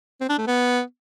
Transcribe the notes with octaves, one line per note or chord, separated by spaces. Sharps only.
C4
D4
A3
B3